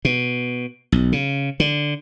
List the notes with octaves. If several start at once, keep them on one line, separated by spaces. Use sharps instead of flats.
B2
B1
C#3
D3